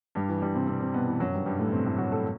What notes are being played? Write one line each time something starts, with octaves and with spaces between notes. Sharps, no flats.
G2 G3
E3
G2 G3
C3 C4
C3 C4
C3 C4
B2 B3
E3
F#2 F#3
G2 G3
G2 G3
A2 A3
C3 C4
A2 A3
F#3 F#4
A3 A4